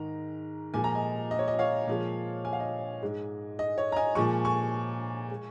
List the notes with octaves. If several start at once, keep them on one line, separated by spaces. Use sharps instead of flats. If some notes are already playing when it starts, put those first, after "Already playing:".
Already playing: G#2 D#3 G#3 A#5
A#2 F3 G#3 G#5
A#5
D#5 G#5
D#5
C#5
D#5
C#5 F5
A#2 F3 G#3
G#5
F5
D#5 G#5
G#2 G#3
D#5
C#5
A#5
D#5 G#5
A#2 F3 G#3 G#5 C#6
G#5 C#6
G#3